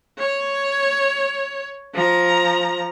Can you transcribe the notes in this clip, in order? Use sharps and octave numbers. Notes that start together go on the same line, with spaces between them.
C#5
F3 A#5